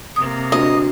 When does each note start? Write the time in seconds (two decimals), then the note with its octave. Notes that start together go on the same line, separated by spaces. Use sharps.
0.16 C3 A#3 D#6
0.52 D2 D#5